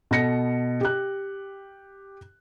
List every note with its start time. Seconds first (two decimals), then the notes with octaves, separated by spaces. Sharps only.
0.11 B2 A4 A#6 C#7
0.81 G4 F#6